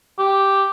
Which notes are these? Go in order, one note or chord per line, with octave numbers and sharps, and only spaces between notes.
G4